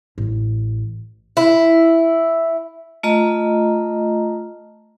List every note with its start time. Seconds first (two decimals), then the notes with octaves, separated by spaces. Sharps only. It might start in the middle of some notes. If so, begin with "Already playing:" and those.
0.18 A1
1.37 E4
3.03 A3 F4 D#5 A#5